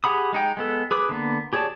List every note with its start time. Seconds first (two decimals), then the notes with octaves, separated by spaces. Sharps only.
0.04 G4 G#4 F#5 B5 D#6
0.33 G#3 D#4 G5
0.57 G#3 B3 A4
0.91 G#4 B4 D6 D#6
1.09 D3 A#3 B3
1.53 G4 G#4 C#5 D5 A5